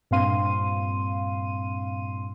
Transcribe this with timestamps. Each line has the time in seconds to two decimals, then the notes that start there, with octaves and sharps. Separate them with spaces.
0.11 G2 A#2 C4 F5 C6 D#7